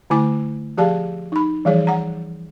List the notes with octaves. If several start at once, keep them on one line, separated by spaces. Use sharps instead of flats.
D3 A3 E4 G#5 D6
F3 G4 G#4 D5 F5 A5
D#4 B5
E3 F3 G3 G#4 C#5
F#5 A#5